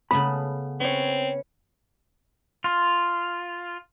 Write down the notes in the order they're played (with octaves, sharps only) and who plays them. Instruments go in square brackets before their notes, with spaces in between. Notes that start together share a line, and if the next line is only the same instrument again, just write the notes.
[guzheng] C#3 A3 B3 [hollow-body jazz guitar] B5
[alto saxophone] C4 [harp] C#4 B4 C#5
[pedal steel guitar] F4